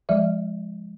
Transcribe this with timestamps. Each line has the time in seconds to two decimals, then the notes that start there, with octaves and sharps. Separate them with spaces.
0.09 F3 G#3 D5 E5